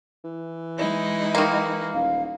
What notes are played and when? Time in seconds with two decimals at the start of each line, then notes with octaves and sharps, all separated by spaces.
0.24 E3
0.78 G#3 D#4 E4
1.35 D#3 A#3
1.93 D#1 F5